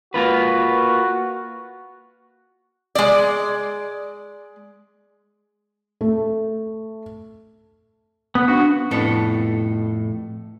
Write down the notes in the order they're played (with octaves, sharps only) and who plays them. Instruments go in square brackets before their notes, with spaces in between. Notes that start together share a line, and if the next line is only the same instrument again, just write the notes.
[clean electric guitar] A#3 F4 B4 [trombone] F#4
[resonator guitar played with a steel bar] G#3 D5
[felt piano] A3
[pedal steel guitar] B3
[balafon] C#4 D4 [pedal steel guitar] F#4
[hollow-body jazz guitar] F2 A2 B3 A4 C#5